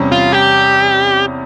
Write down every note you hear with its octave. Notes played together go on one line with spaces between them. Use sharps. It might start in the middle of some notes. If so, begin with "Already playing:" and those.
Already playing: E2 C3 G3 C#4
F4
G4